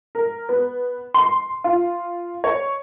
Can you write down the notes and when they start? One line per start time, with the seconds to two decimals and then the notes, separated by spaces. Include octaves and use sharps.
0.15 A#4
0.49 B3
1.14 C6
1.64 F4
2.44 C#5